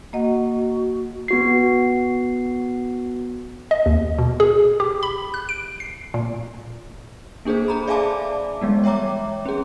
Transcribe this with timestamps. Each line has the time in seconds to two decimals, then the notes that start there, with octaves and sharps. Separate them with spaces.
0.13 A#3 F#4 D#5 F#5
1.28 B3 F#4 C7
3.71 D#5
3.86 D#2
4.18 B2
4.40 G#4
4.80 G4
5.03 B5
5.34 F#6
5.49 D7
5.80 C7
6.14 A#2
7.45 A#3 D4 G#4 A4 C5
7.68 G#4 A#5 B5
7.87 D5 E5 F5 G#5 A5 D6
8.61 E3 G3 G#3 B3
8.84 C#5 E5 G5 A#5 D6
9.46 C#4 G#4